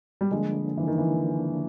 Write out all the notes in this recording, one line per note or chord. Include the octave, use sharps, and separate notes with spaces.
G3
D3 F3 G#3 A#3 D4
E3
D#3
E3